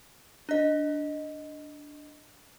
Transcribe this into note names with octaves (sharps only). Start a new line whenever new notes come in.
D4 D#5